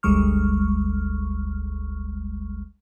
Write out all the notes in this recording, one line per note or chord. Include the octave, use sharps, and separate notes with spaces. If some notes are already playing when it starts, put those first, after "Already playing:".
G1 D2 G3 G#3 C#6 F6